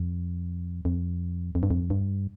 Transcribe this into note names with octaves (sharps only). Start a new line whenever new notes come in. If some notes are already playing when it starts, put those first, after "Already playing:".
Already playing: F2
F2
F2
G2
F2
G2